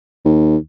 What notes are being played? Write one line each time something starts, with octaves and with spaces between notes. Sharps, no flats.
D#2